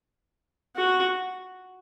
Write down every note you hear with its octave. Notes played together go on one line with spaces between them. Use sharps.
F#4